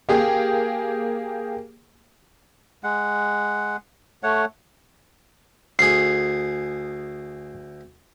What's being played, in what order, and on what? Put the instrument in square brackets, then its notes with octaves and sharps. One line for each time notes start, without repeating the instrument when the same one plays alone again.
[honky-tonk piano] A#3 G4 G#4
[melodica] G#3 F#5
A3 C#5 F#5
[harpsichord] D2 G#4 [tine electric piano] C7